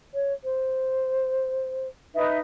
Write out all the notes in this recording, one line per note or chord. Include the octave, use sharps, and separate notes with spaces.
C#5
C5
D#4 B4 E5